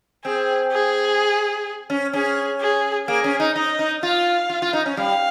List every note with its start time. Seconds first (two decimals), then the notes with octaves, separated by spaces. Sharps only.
0.25 C4 G#4
0.72 G#4
1.90 C#4
2.13 C#4 G#4
2.61 G#4
3.08 A#3 G#4
3.24 C#4
3.40 D#4
3.55 D#4 D#5
3.79 D#4
4.03 F4 F5
4.50 F4
4.62 F4
4.73 D#4
4.86 C#4
4.97 G3 F5